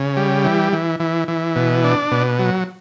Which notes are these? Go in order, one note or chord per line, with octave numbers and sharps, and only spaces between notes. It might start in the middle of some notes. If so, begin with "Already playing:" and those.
Already playing: C#3
G3
E3
E3
E3
E3
B2
D4
B2
F#3